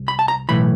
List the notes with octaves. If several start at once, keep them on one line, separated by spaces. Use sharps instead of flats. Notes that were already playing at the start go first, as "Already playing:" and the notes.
Already playing: C2
B5
A5
A#5
B1 A2 E3 B5